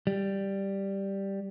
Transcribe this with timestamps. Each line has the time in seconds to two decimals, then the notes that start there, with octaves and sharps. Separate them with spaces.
0.07 G3